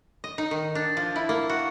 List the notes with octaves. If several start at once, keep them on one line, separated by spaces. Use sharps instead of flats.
D#5
D#4
D#3
D4
F3
E4
A#3
F#4